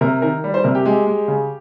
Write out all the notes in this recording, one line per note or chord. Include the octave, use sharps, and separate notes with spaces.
C3 A#4
D#3 A#4
G3
C5
C3 A#4
G4
G#3 G4
G#3
C#3